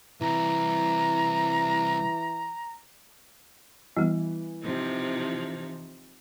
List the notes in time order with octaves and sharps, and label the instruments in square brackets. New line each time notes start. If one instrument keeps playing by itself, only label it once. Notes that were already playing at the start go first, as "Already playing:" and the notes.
[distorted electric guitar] C2 [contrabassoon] E3 [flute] A#5
[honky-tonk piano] E3 [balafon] G3 B3
[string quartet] C3 F3 D#4